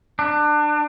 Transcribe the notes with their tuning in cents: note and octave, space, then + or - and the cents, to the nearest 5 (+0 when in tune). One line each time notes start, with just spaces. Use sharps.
D4 +25